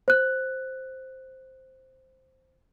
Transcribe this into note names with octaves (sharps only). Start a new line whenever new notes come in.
C5 F#6